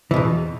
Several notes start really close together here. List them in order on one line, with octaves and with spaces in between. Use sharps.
E3 B2 E2